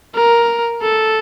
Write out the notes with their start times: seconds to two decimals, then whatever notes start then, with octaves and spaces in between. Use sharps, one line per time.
0.15 A#4
0.82 A4